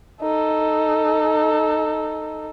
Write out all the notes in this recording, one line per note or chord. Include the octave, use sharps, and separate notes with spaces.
D#4 A4